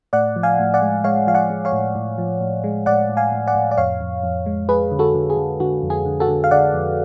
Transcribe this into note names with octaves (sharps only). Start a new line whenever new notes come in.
A2 D5 F#5
F3
F5 G#5
A2
D5 F#5
G#3
G#3 C#5 F5
F3 F5
D5 F#5
G#3
C#5 F5
A2
A2
F3
A2
G#3
A2 D5 F#5
A2
F5 G#5
A2
D5 F#5
A2
D5
F2 C#5 F5
F2
F2
G#3
F2 G#4 B4
D3
F#4 A4
D3
G#4
D3
D3 F#4
F2
G#4
D3
F#4 A4
D3
F5
D3 D5 F#5
F2